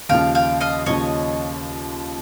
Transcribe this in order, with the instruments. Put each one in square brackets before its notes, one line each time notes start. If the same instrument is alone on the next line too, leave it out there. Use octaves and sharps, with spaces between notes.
[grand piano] D#2 C#3 F3 [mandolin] F5 G5
[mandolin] F5 G5
D#5 F5
[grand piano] D#2 C#3 F3 [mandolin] C#5 D#5